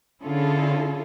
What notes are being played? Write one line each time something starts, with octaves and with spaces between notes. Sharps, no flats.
D3 C#4 E4 F4 G#4 A4